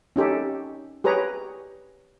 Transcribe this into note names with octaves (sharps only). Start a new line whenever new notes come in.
C#4 D#4 G4 A4
G4 G#4 B4 C#5 A#5